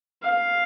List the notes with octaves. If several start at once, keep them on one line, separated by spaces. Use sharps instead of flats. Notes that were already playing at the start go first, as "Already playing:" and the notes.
F5